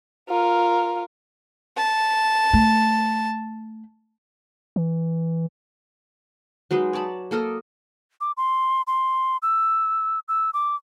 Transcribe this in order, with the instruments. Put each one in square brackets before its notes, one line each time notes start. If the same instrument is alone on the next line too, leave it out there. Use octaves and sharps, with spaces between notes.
[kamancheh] F4 A#4
[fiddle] A5
[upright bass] A3
[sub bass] E3
[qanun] F#3 G#3 D#4 B4
C#5 D5 A5 B5
A#3 A4 A#4 D#5
[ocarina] D6
C6
C6
E6
E6
D6